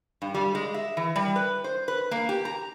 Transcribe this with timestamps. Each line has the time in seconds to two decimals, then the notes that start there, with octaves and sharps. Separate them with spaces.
0.22 G2
0.35 G3
0.55 G#3
0.74 E5
0.97 E3
1.16 G3
1.36 B4
1.64 C5
1.88 B4
2.11 A#3
2.29 G4
2.45 A#5